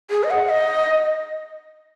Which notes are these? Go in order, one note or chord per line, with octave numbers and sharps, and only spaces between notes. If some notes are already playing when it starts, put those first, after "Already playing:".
G#4
D#5
F#5
D#5